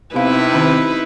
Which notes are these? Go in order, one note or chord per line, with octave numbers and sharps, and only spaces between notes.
C3 B3 C4 D#4 E4 B4 F5
D#3 C4 C#4